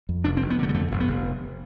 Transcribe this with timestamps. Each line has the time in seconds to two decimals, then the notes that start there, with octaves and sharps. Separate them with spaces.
0.09 F2
0.24 F1 D4
0.37 C4
0.42 F1
0.50 B3
0.59 D3 A3
0.69 G3
0.74 F2 A3
0.92 F1
1.00 B3
1.08 F1